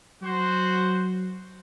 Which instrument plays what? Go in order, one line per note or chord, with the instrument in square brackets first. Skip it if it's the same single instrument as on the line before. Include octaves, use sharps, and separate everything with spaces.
[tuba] F#3 [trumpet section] F#4 C5